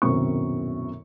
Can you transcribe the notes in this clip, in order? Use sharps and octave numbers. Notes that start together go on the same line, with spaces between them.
D#1 C2 F#2 B2 C4 C#6